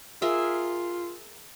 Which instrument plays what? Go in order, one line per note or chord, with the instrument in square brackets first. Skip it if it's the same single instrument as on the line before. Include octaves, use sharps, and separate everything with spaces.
[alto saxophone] F4 [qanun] G#4 A#4 E5